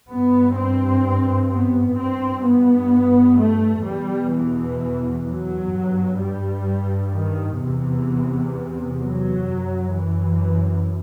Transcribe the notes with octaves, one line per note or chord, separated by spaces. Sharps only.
G2 B3
C4
B3
G2 C4
B3
A3
E2 B2 G3
E3
F#3
G2
G3
D#3
E2 C3 E3
F#3
F#2
E3